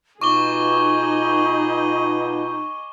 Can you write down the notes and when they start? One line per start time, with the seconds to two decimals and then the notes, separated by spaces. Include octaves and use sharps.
0.22 B2 D#4 F4 G#4 D#5 C#6 D6 G7